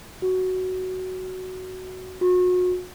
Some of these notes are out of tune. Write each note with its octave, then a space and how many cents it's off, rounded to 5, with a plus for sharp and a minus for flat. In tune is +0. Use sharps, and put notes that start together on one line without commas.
F#4 +5
F#4 -35